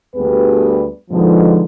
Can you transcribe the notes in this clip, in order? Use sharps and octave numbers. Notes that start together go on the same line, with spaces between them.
D2 G2 G3 B3 G#4 B4
G#2 B2 D3 F3